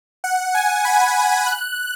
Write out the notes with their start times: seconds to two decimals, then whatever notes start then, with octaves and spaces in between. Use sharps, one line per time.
0.24 F#5
0.55 G#5
0.85 B5
1.46 F#6